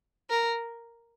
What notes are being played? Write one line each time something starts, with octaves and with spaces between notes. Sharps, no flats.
A#4